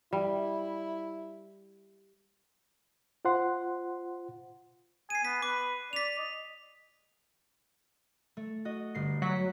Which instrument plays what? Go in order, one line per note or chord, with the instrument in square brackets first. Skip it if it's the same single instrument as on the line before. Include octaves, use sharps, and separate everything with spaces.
[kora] G3 [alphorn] E4
[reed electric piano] F4 C5 F#5 C6
[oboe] G#5 [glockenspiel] C7 D#7
[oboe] B3 [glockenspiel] B6
[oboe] B4 [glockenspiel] D6
[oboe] D5 [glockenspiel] B6 F7
[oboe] D#5
[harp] A3
F#4 D#5
G1 C7
[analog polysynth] F#3 [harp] F#5 B6